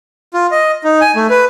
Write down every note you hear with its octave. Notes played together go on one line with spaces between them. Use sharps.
F4
D#5
D#4
G#5
A3
B4